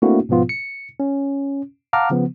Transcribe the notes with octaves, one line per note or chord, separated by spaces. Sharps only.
A3 A#3 C4 D4 E4 F#4
G#2 B2 F3 B3 F4
C#7
C#4
F5 F#5 A5 A#5 D6 F6
C#3 F3 B3